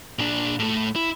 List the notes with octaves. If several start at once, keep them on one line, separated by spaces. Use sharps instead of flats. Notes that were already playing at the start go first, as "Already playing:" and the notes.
A#2 D4
A2 A3
E4